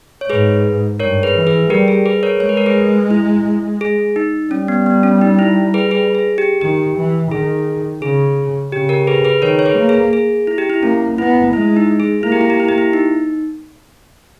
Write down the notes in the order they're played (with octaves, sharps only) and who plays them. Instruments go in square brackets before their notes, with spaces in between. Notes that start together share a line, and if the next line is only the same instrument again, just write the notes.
[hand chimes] C#5
[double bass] G#2 [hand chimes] G#4 B4
[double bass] G2 [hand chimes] A#4 C#5
[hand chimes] G#4 B4
[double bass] E3
[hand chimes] G#4 B4
[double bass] G3 [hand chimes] G4 A#4
[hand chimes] G#4
G#4 B4
A#4 C#5
[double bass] G#3 [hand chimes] C#5
[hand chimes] B4
A#4
G#4 B4
E4
G#4
D#4
[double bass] G3 [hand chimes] C#4
[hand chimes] B3
B3
C#4
D#4
E4
G#4 B4
G#4 B4
G#4
G4
[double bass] D#3 [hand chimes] G4
[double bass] E3
[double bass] D#3 [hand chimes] G#4
[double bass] C#3 [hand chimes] G#4
[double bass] C#3 [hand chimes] G4
[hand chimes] G4 A#4
G#4 B4
G#4 B4
[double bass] D#3 [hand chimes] A#4 C#5
[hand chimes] C#5
G#4 B4
[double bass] A#3
[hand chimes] G#4
G#4
E4
G4
E4
[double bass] A#3 [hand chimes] C#4
[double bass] B3 [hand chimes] E4
[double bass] G#3 [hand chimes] E4
[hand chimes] D#4
G#4
[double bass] A#3 [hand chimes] E4
[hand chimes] G4
E4
G4
E4
G4
E4
D#4